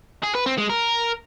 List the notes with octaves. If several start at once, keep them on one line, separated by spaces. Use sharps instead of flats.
G#4
B4
C4
G#3
A#4